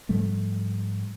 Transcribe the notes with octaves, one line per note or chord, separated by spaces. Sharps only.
G#2 F3 G3 A3